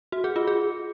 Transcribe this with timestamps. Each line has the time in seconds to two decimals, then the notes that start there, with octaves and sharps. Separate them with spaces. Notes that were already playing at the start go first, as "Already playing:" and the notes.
0.12 F#4
0.24 G#4
0.36 F4
0.47 G#4